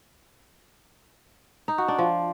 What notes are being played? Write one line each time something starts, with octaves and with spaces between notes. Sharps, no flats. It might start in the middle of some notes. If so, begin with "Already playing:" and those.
D#4
F#4
D4
F3